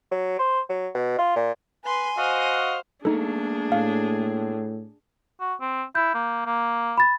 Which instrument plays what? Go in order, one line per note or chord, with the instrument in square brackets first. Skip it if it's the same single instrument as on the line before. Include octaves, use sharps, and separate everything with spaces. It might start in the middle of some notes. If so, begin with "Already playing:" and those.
[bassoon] F#3
C5
F#3
B2
F4
A#2
[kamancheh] B4 C6 [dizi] G#5
[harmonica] F#4 D#5 F5 [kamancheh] C5
[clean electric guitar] A3 A#3 [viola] D4 G#4 [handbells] D#4 A4
[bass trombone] A2 [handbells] F5
[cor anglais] F#4
C4
[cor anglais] E4 [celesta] G6
[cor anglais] A#3
A#3
[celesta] B5 A6